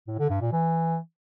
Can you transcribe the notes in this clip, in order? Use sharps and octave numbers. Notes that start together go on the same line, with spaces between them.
A2
D3
G2
A#2
E3